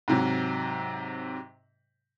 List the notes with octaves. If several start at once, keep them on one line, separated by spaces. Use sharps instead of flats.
G#2 C3 F#3